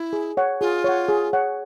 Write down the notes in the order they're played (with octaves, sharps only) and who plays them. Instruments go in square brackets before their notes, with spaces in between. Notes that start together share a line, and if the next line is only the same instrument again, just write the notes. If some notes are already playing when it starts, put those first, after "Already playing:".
Already playing: [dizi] E4
[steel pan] G#4
C#5 F#5
[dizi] F4 [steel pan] G#4
[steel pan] C#5 F#5
G#4
C#5 F#5